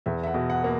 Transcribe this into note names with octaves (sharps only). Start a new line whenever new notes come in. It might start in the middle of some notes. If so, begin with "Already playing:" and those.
E2 E5
E5
F#5
B2
F#5
A#3